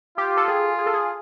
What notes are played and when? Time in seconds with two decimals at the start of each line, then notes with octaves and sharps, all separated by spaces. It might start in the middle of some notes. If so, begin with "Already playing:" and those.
0.18 F4 G4
0.37 A4
0.48 G#4
0.78 G#4
0.86 A4
0.94 G#4